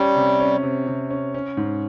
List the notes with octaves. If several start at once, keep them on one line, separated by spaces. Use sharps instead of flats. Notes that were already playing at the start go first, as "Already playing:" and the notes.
Already playing: G3 C#4
C3
C#4
C3
C3
C#4
C#4
G#2